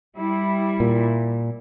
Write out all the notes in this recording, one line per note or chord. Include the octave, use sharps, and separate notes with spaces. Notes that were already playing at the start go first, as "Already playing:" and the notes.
G3 E4
A#2